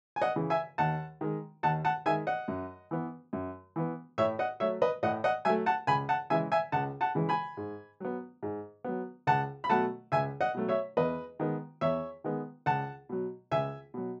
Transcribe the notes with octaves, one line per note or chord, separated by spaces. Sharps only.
G#5
D#5 F#5
C#3 E3
E5 G#5
D#2 F#5 A5
D#3 G#3
D#2 F#5 A5
F#5 A5
D#3 G#3 E5 G#5
D#5 F#5
F#2
E3 B3
F#2
E3 B3
A2 C#5 E5
D#5 F#5
F#3 A3 C#5 E5
B4 D#5
A2 D#5 F#5
D#5 F#5
F#3 A3 E5 G#5
F#5 A5
C#2 G#5 B5
F#5 A5
C#3 E3 G#3 E5 G#5
E5 G#5
C#2 F#5 A5
F#5 A5
C#3 E3 G#3
G#5 B5
G#2
F#3 B3
G#2
F#3 B3
C#2 F#5 A5
B5
B2 F#3 A3 F#5 A5
C#2 E5 G#5
D#5 F#5
B2 F#3 A3
C#5 E5
E2 B4 D#5
D#3 G#3 B3
E2 C#5 E5
D#3 G#3 B3
C#2 F#5 A5
B2 F#3
C#2 E5 G#5
B2 F#3